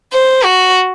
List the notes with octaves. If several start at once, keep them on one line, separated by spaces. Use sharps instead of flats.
C5
F#4